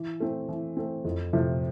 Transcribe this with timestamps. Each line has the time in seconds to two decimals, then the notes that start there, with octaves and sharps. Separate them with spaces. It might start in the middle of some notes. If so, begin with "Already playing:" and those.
Already playing: E3
0.20 A3 C4
0.48 E3
0.77 A3 C4
1.05 F2
1.33 C3 F3 A3